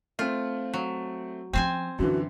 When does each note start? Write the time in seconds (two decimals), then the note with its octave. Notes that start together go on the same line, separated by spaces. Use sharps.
0.19 A3 C4 F4
0.74 F#3
1.53 F3 C4 C#4 C5 G#5
1.99 F#2 D3 E3 F4 F#4